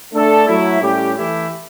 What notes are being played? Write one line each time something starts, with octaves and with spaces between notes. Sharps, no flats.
A3 D4 A4
F#3 A3 E4
A2 G3 C#4 G4
E3 A3 E4 G4